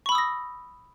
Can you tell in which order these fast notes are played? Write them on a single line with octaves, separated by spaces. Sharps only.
C#6 B5 E6 D#6 A#6